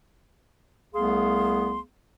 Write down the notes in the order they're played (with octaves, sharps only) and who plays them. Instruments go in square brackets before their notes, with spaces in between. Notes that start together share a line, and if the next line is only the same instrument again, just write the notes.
[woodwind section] C2 A3 B3 G#4 F5 C6